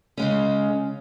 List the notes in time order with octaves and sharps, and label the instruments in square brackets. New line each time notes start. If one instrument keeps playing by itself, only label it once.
[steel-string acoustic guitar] C#3 G#3 C#4